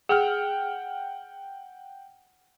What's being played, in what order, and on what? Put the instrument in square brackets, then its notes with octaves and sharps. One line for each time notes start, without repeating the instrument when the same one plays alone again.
[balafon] G#4 [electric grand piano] F#5 G5 F6